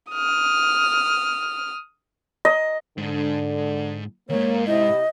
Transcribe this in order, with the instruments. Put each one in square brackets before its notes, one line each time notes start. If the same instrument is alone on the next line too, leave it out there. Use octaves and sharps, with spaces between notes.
[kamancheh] D#6 F6
[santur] D#5
[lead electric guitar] G#2 [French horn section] D3
[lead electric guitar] D#2 G#2 [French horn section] A#3 [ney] C#5
[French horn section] C3 E4 [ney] D#5